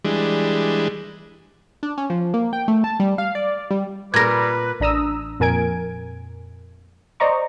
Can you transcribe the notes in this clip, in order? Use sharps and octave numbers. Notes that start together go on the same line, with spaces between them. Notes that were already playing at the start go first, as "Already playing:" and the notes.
E3 G3 G#3 D4
D4
C#4
F3
A#3
G5
A3
A5
G3
F5
D5
G3
A#2 G3 A#4 B4 G#6 A#6
A1 D4 A#5 D#6 E6
F2 A#2 A#4 G#5 G#6 D7
C5 D5 D#5 A#5 C#6